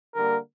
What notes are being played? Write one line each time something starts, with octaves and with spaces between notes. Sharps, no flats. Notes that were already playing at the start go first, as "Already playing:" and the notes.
D3 G3 A#3 A#4